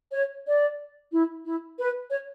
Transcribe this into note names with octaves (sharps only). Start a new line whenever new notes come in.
C#5
D5
E4
E4
B4
C#5